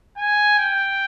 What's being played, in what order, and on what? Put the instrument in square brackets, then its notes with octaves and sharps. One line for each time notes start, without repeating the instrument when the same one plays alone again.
[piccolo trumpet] G#5
G5